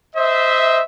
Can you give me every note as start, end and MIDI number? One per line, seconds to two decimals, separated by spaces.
0.16 0.81 72
0.16 0.81 75
0.16 0.81 76